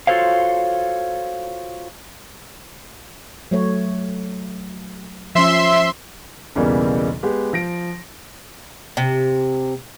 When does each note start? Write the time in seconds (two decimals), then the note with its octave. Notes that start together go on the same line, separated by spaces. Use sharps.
0.07 F4 F#4 A4 C5 C#5 F5
3.51 F#3 A3 C#5
5.35 F3 C#4 E5 C6
6.55 B1 E2 C#3 E3 G3 A#3
7.23 G#3 B3 G4
7.53 F3 A#6 D7
8.97 C3